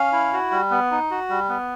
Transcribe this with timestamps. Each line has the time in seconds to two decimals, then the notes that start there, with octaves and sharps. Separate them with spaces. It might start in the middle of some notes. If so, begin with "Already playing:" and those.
Already playing: C#4 F5
0.12 E4
0.33 F#4
0.51 G3
0.71 B3
0.91 D#4
1.11 F#4
1.29 G3
1.49 B3